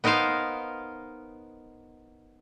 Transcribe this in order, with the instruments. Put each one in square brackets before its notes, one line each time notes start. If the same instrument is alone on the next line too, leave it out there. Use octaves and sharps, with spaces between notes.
[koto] B3 D#4 A#4 C5 F5